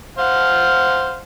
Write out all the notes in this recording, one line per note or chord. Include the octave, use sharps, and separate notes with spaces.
C5 F5 F#5